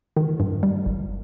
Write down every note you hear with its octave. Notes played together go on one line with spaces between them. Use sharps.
D#3
G2
G3
G1